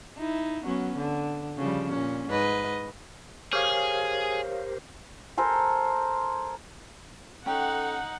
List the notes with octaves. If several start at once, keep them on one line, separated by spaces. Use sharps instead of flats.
D#4 E4
F#3 B3 C#4
D3
C#3 F3 G3
A#2 C#4
G#2 B4 D#5
G4 G#4 A#4 C5 C#5 F5
A4 A#4 C5 G#5
C#4 D#4 A4 F#5 G5